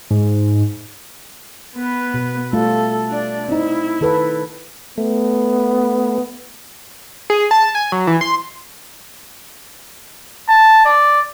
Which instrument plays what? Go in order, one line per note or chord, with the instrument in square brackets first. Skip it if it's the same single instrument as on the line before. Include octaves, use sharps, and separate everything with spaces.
[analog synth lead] G#2
[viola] B3 B4
[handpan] B2
[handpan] G3 A3 F4 [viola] A4
[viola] D4 D5
[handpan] C4 D#4 [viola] E4
[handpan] D#3 A4 B4
[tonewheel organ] A3 [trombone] B3
[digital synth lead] G#4
A5
G#5
F#3
E3
C6
[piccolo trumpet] A5
D5